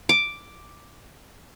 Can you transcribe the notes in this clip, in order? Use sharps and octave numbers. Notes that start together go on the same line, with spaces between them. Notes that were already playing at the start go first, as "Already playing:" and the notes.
D6